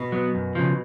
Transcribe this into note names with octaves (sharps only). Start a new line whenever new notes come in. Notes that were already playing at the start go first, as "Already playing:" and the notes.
Already playing: B2
F#3 B3
F#2
C#3 F3